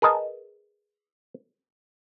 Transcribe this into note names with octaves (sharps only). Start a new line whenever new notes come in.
G#4 A#4 B4 D#5 G#5 A5